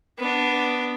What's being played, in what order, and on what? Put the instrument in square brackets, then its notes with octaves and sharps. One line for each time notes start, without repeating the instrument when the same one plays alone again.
[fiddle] B3 D4